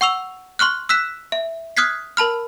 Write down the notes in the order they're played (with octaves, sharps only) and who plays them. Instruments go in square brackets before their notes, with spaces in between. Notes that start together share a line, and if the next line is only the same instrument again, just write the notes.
[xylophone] F#5 C#6 E6 F7
C6 C#6 F6 F#6
E6 F#6 B6 E7
E5
D#6 F6 F#6 G#6 B6 C7
A#4 A5 B5 F6